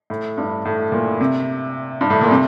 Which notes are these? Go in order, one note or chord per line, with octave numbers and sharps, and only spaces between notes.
A2
G2
A2
A#2
C3
G2
A2
A#2
C3